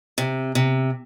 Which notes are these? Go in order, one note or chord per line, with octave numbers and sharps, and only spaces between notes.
C3
C3